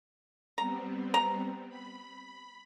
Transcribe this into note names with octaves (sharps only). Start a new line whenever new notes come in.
G3 B3 C4 A#5
A#5
B5